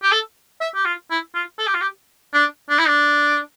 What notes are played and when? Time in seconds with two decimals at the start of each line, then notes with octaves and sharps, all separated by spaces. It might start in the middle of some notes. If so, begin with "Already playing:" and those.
0.03 G4
0.12 A4
0.61 E5
0.75 G4
0.85 F4
1.10 E4
1.35 F4
1.59 A4
1.67 G4
1.74 F4
1.81 G4
2.33 D4
2.69 D4
2.79 E4
2.88 D4